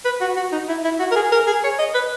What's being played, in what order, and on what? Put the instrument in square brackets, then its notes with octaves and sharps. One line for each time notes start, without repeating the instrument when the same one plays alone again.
[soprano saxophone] B4
F#4
F#4
D#4
E4
E4
F#4
A#4
G#4
A#4
G#4
C#5
D#5
B4